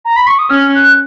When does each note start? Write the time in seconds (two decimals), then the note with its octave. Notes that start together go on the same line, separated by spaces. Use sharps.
0.05 A#5
0.16 B5
0.27 C#6
0.39 D#6
0.50 C#4 F6
0.75 F#6